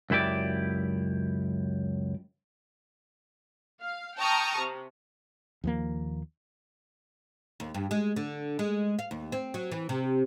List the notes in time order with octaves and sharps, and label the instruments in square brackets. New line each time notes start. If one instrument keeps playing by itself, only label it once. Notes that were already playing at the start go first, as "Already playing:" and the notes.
[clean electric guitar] C#2 F#2 E4 G4 D5
[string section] F5
G5 A5 A#5 C#6 D#6 F6
C3
[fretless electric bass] D#2 F3 A#3
[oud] D#2
G2
G#3
D3
G#3
F5
D#2
C4
F#3
E3
C3